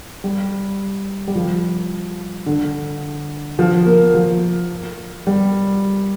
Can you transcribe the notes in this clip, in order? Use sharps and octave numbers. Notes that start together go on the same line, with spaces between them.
G3
G3
F3
D3
F3
A#3
F3
G3